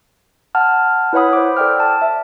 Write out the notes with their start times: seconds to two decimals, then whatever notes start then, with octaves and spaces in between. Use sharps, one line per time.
0.55 F#5 A5 F6
1.13 E4 B4 C#5 F#5 B5 D#6
1.33 C5 D6
1.57 A4 D5 G5 F6
1.80 A5
2.02 E5